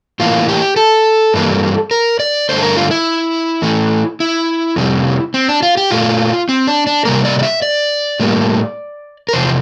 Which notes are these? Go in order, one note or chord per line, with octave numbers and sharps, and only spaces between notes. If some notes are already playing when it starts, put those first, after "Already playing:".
A2 E3 A#3 F4
G4
A4
G2 E3 G3 A#3
A#4
D5
G2 D3 A3 C5
A4
A#4
F4
E4
A2 E3 A3
E4
F2 C3 G3
C4
D4
F4
G4
A#2 A3 F4
C4
D4
D4
C3 G3 A#3 A#4
D5
D5
E5
D5
A2 G3 A#3
A#4
E2 C3 F3 C5